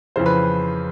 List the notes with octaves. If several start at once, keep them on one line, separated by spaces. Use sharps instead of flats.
F2 C#3 E3 C5
B4